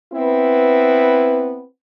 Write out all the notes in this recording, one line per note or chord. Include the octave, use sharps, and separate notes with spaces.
B3 C4 E4 B4